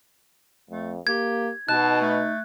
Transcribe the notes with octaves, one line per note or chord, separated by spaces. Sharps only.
F2 A3
A#3 G4 G#6
B2 D#4 A5 F#6
A3